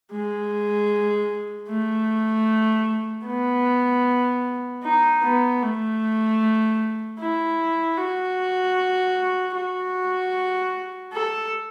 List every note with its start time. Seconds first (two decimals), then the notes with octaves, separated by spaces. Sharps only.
0.12 G#3
1.69 A3
3.26 B3
4.83 D#4
5.23 B3
5.62 A3
7.20 E4
7.98 F#4
9.55 F#4
11.13 A4